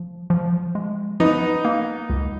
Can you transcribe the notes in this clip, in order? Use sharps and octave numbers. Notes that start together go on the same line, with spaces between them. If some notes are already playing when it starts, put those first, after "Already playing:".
Already playing: F3
F3
G#3
F3 B3 D#4
A#3
C#2